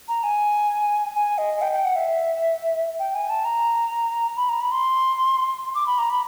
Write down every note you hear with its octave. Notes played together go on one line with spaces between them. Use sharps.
A#5
G#5
G#5
D#5
G5
G5
F#5
E5
G5
G#5
A5
A#5
B5
A#5
B5
C6
D6
B5
A#5
B5